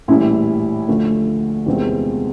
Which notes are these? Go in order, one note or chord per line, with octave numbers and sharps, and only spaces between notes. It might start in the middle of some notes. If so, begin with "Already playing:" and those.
A#1 A2 E3 G3 E4
D2 D3 F3 A3
E2 C3 D#3 G#3 C4 F4